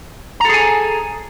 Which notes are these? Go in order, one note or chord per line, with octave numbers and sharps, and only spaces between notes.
G#4 A4 G#5 A#5